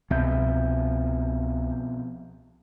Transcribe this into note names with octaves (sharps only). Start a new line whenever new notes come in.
C2 B2 F3 C4 E5 G6